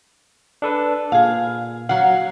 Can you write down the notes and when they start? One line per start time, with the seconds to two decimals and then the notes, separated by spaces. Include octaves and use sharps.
0.62 D4 A4 B4
1.12 A#2 G#4 F5
1.89 F#3 F5 F#5